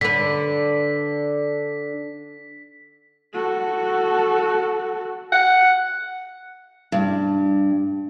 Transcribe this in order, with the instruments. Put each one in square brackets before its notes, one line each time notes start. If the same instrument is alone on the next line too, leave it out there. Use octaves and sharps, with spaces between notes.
[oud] D3 B4 [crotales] B6
[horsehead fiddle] F#4 A4
[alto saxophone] F#5
[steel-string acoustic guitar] G2